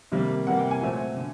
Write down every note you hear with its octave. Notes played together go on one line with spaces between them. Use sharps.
C3 D#3 G3 A#3
C3 E3 G3 A#3 F#5
G5
G#5
A#2 F#3 A3 C4
D3